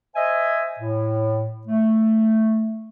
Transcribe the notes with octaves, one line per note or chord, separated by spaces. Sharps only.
C5 D#5 E5 G#5
A2
A3